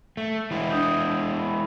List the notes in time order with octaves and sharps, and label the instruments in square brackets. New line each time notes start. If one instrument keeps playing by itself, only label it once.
[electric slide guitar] A3
E3 G#3 E4
[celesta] D4 D#6 G6
B5